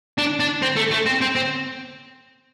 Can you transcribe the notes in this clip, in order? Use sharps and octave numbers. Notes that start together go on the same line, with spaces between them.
D4
D4
C4
A3
A3
C4
C4
C4